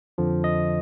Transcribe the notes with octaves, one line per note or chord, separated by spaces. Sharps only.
F2 D3 F3
D#5